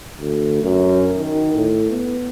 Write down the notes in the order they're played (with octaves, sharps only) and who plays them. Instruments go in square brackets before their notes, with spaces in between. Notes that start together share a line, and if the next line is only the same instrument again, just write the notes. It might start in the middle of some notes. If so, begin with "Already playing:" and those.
[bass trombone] D2
F#2
D#3
A2
B3